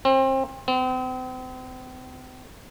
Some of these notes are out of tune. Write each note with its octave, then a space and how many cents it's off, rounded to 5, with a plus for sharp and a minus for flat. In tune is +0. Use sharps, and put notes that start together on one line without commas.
C4 +30
C4 -40